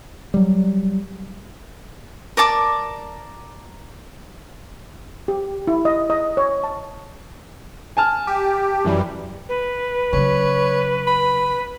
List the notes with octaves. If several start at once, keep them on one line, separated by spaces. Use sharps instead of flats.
F#3 G3
A#4 D5 A5 D6
G4
E4
D#5
D#5
C#5
A5
G#5 A5 F6
G4
F#2 E3 G3
B4
C#3 F#3 C#5
B5